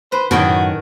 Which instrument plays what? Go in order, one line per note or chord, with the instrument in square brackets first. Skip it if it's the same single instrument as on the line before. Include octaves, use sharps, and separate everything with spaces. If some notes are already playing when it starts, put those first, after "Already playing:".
[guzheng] B4 [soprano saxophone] C5
[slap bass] F#2 [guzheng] A2 D5 G5 [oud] D#3 [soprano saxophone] F#4